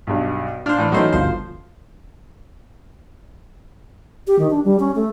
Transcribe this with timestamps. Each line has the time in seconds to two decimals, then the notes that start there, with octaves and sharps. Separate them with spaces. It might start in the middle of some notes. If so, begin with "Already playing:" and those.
0.07 B1 G2
0.66 A#2 D4 C5 F6
0.78 A2 E3
0.92 E3 F#3 A3 C#4 D#4 C5
1.13 G1 D2 F3 C5
4.27 G4
4.39 D#3
4.50 D4
4.64 G3
4.80 C#4
4.95 A3